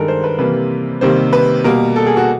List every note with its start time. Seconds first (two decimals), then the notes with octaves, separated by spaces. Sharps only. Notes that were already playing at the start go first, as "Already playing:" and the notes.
Already playing: G2 D#3 G#3 A4 A#4
0.08 C5
0.24 B4
0.39 C3 E3 G3 A#3 B4
1.01 C3 D#3 G3 A#3 C5
1.33 B4
1.64 B2 G3 A#3 A#4
1.96 A4
2.07 G#4
2.17 F#4